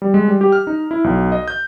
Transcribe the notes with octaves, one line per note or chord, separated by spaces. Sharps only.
G3
G#3
G3
G4
F6
D#4
E4
B1
D#5
G6